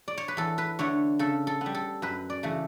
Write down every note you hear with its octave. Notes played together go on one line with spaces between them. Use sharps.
D5
C#5
B4
E2 A4
B4
D3 A3 C#5
C#3 A4
A4
G3 B3
A4
F#2 B4
D5
C#3 E3 A3